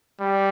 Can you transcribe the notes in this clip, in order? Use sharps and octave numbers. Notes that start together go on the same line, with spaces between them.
G3